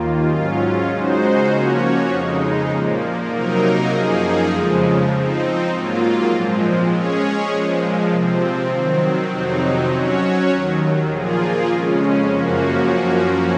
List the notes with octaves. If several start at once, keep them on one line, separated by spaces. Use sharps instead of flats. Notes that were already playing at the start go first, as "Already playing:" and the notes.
Already playing: D#2 D#3 A#3 F4
G#2 F#3 C#4 F4
C#3 G#3 D#4 F#4 C5
F3 A#3 C#4 F#4 C#5
F2 C#3 G#3 D#4
A#2 F3 A#3
C3 F#3 A#3 D#4 A#4
F#2 F3 A#3 D#4 G#4
F2 C#3 F3 G#3
F3 C4 D#4
G#2 F#3 A#3 F4
A#2 F3 G#3 C4
G#3 C#4 G#4 C#5
A#2 F3 G#3
C3 F3 C4
D#3 F#3 C4
F2 C3 F#3 C4 D#4
F#3 C#4 F#4 C#5
D#2 D#3 F#3
A#2 F3 A#3 F4 G#4
F2 C#3 G#3 C#4
F#2 F3 A#3 C#4 F#4